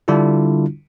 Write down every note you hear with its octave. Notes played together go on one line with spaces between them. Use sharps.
D3 G3 D4 E4 F4